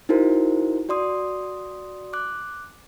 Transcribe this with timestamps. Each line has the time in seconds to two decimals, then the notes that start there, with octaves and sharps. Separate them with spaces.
0.09 D#4 E4 F#4 A#4 C5
0.89 F#4 D5 C6 D#6
2.13 D6 F#6